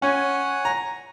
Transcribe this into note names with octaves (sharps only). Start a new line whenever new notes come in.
C#4 C#5 F#5 G#5
A#5